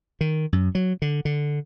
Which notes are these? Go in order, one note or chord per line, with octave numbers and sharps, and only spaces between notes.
D#3
F#2
F#3
D3
D3